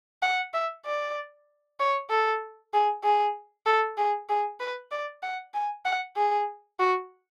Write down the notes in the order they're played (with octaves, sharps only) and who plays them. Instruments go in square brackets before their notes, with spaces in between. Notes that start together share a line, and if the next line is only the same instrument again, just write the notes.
[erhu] F#5
E5
D5
C#5
A4
G#4
G#4
A4
G#4
G#4
B4
D5
F#5
G#5
F#5
G#4
F#4